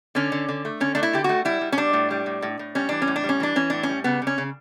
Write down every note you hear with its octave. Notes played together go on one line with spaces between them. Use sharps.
D3 C#4
D3
D3
A3
D3 C#4
A3 D4
E4
D3 G4
A3 F#4
G3 E4
G3
C#4
G3 D4
A2
G3
A2
A2
A2
G3 C#4
E3 D4
C#4
A2
D4
G3
C#4
E3 D4
E3 C#4
A2 D4
C#4
G3
C#3 B3
C#3
C#4
C#3